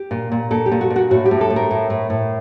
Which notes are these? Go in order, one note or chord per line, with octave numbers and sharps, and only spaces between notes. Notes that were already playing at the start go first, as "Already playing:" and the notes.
Already playing: G4
A#2
A#2
A#2 A4
G4
A#2
F#4
A#2
F#4
A2 F#4
G4
A2
A4
A2
A#4
A2
A2
A2